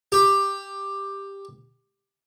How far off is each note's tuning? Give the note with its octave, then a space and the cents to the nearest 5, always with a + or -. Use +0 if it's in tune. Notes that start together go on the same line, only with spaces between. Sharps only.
G4 +10